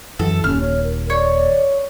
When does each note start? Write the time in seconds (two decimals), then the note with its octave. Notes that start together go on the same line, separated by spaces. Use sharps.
0.19 F#2 E3 A4
0.44 D#1 D#2 C#4 F6
0.61 C#5
0.84 A#4
1.10 C#5 D5